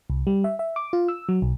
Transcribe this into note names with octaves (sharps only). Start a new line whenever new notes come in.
C2
G3
E5
E5
D6
F4
E6
F#3
B1